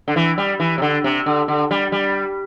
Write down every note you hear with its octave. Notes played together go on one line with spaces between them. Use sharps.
D3
E3
G3
E3
C3
D3
C3
D3
D3
G3
G3